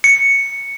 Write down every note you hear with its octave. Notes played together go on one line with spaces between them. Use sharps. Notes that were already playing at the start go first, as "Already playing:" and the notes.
C#7